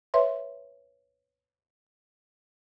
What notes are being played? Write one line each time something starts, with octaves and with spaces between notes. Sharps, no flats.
B4 C#5 E5 C6